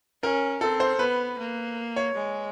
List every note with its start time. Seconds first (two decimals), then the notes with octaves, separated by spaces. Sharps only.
0.23 C#4 A#4
0.61 C4 A4
0.80 C5
0.99 B3 B4
1.39 A#3
1.96 C#5
2.15 G#3